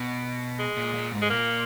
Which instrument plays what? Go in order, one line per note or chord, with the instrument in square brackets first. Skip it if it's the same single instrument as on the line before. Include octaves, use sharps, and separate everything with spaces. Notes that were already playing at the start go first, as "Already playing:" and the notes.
Already playing: [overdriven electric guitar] B2
[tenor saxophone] G#3
[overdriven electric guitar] A#2
A#2
G#2
[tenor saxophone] G#3
[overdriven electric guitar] A#2 [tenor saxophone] A#3